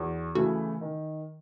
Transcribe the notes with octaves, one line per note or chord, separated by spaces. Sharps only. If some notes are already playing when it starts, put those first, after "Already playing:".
Already playing: E2 F#4
C#3 E3 A3 E4 F#4
D#3